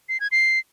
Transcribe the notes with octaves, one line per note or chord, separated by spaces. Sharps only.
C7
G#6
C7